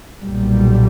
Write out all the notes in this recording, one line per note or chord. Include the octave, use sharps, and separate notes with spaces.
B1 A#2 G3